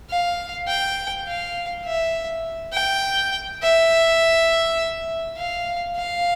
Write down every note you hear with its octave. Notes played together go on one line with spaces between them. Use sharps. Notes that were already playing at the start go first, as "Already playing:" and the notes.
F5
G5
F5
E5
G5
E5
F5
F5